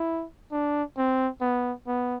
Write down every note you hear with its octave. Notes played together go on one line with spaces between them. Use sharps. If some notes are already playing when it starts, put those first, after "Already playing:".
Already playing: E4
D4
C4
B3
B3